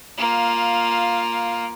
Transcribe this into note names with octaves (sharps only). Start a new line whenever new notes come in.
A#3 F4